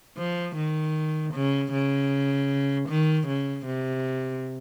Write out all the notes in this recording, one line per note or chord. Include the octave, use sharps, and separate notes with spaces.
F3
D#3
C#3
C#3
D#3
C#3
C3